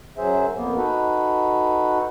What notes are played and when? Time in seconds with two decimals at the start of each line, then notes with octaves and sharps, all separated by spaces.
0.17 F#2 F#3 G#4 C5 E5
0.56 F2 A#3 B3
0.76 D#4 F#4 A4 B4